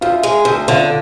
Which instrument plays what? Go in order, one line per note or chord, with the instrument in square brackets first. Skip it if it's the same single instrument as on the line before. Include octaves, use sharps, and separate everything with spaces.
[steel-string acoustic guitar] D2 [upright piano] F4
[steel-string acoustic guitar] G#3
D2
[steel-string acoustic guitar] D3 [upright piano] F4